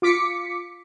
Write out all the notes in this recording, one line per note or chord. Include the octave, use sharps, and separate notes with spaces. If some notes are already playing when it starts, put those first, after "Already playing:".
F4 D6 B6 C#7